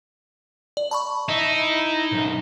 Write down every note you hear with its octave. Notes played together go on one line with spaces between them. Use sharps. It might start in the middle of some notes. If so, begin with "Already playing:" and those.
D5
A5 B5 C#6
D#4 E4 E5
B1 F#2